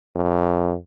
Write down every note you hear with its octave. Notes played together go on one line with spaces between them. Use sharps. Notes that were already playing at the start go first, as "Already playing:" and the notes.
F2